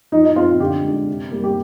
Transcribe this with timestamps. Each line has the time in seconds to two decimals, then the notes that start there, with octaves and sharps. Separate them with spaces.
0.12 F3 D#4
0.24 D#4
0.36 C4 F4
0.60 D3 G4
0.83 G#3 D4
1.07 C3
1.31 G3 A#3
1.44 G4